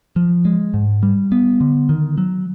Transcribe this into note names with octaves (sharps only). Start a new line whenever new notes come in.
F3
G#3
G#2
G3
B3
D3
D#3
F#3